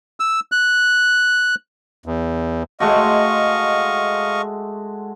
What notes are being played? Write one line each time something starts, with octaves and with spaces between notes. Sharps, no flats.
E6
F#6
E2
G#3 A3 F#4 D#5 F5 C#6